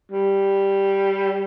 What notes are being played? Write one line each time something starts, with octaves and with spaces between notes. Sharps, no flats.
G3